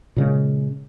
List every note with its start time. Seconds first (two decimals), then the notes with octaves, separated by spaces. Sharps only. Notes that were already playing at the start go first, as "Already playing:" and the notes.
0.16 A#2 C#3 G#3